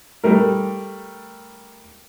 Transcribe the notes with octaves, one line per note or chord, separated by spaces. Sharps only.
G3 A3 A#4